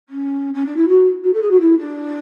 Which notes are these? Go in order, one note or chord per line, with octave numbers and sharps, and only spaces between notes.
C#4
C#4
D4
E4
F#4
F#4
A4
G#4
F#4
E4
D4